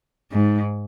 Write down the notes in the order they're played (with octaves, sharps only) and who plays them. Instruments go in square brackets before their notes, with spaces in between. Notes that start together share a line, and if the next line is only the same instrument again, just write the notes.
[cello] G#2